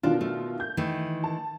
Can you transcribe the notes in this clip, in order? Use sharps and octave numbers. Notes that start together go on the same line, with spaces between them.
B2 D#3 D4 F4
A3
G6
D#3 E3 A3
A5